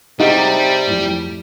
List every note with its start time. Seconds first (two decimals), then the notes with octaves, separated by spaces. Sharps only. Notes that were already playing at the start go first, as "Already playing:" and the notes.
0.20 C3 G3 D#4 G#4 F#5
0.87 F2 A2